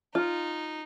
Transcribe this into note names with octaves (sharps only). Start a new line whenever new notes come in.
D#4 F4